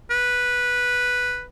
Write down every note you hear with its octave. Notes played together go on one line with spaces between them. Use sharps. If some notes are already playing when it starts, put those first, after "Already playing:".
B4